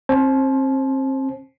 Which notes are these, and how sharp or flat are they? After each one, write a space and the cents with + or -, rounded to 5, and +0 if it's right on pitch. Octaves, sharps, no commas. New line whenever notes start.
C4 +35 C5 +25 A5 -40